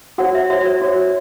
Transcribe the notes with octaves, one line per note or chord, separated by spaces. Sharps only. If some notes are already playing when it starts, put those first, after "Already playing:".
F#4 C#5 F#5
E5
F#4 C#5 E5
C#5
F#4 C#5